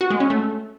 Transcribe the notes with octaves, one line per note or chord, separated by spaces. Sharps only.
F#4
G#3
C#4
A3